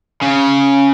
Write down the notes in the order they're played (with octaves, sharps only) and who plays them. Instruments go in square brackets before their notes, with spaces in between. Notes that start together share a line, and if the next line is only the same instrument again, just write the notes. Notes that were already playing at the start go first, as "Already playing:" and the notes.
[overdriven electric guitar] C#3